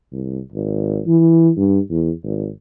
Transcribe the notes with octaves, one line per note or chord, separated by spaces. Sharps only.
C2
G#1
E3
G2
E2
G#1